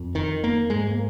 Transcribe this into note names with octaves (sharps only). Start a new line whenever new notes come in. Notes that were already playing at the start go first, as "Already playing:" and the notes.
Already playing: F2
D#3
A#3
G#2 G#3
A#3